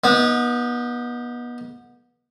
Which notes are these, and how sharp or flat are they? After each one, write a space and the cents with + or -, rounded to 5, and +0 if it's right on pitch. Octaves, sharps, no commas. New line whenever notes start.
B3 -30 D#4 +10